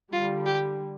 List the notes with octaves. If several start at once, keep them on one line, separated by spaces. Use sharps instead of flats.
D3 G3 F4
G4